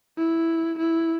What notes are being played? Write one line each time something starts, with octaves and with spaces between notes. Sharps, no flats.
E4
E4